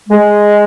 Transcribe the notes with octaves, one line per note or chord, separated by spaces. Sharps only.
G#3